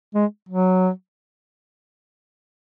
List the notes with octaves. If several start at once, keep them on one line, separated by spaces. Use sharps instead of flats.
G#3
F#3